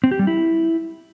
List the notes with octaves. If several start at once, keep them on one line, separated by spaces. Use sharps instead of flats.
C4
G4
G3
E4